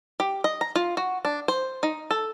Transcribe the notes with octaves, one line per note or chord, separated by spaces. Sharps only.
G4
D#5
A#5
F4
F#4
D4
C5
D#4
A4